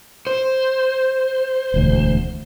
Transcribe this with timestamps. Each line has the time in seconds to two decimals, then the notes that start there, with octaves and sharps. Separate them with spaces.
0.27 C5
1.74 E1 D2